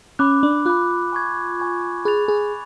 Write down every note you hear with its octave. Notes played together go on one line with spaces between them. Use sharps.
C#4 B5 D6 F#6
D4
F4 B5 D6 F#6
G#5 C#6 G#6
G#5 C#6 G#6
G#4 B5 F#6 A6 F7
G#4